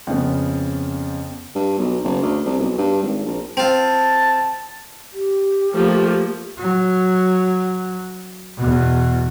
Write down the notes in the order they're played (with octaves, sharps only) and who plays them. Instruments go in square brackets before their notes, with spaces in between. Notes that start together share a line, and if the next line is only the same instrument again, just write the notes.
[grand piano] F2 C#3 B3
[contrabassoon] G2
B1
F#1
D2
C2
B1
G2
G#1
A#1
[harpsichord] C4 F4 [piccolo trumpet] A5
[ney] G4
[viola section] F3 A3 A#3
[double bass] F#3
E2 B2